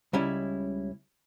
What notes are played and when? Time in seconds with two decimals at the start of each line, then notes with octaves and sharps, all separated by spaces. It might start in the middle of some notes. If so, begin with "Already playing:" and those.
0.13 C#2 G3 C#4 E4